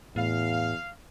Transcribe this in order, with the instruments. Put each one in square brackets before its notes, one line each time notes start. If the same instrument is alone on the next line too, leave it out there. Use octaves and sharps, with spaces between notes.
[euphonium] E2 [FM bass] A2 [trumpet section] F5